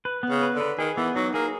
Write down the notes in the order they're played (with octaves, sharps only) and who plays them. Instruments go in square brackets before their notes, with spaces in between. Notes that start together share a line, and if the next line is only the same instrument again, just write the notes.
[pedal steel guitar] B4
B3
[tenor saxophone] C#3
[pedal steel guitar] B4
[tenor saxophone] D3
[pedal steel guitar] B4
[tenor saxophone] D#3 [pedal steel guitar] G#4
[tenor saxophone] E3 [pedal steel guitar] B3
[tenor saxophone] F#3 [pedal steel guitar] D#4
[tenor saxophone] A#3 [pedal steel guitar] G#4